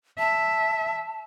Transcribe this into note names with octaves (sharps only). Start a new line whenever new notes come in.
E5 A5